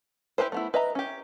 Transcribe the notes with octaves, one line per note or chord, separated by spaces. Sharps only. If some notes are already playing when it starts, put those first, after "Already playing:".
E4 G4 A4 B4 C5
A3 B3 E4
B4 D#5 E5 A#5
C#4 G4